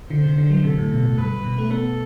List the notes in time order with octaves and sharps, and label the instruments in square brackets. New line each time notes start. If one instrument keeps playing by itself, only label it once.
[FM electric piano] D3 [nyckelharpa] C5
[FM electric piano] C3
D3
F#3
[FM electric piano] C3 [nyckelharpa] A4
[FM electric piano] A2
B2
A2
[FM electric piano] G2 [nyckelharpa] B4
[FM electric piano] B2
A3
[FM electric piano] B3 [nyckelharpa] A4